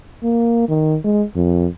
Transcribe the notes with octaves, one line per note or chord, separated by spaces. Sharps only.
A#3
D#3
G#3
F2